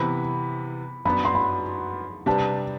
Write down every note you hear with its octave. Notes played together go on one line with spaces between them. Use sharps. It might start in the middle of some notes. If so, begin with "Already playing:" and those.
Already playing: C3 E3 B3 B5
F#2 F#3 B3 D4 B5
C6
B5
C3 G3 D4 G4 B4 A5